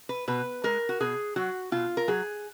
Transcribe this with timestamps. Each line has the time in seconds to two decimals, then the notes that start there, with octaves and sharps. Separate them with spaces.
0.09 B4
0.28 B2 B4
0.64 G#3 A#4
0.89 F#4
1.00 B2 G#4
1.36 F#3 F#4
1.72 B2 F4
1.97 A#4
2.08 F#3 G#4